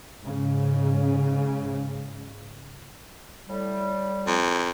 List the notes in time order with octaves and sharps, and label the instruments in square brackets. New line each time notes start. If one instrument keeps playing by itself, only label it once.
[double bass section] G#2 C#3
[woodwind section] A2 G3
[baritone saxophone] F2